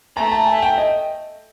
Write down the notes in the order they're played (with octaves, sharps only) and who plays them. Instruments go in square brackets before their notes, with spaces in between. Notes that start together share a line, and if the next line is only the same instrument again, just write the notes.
[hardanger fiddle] A3 [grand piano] A#5
[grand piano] A5
G#5
G5
D#5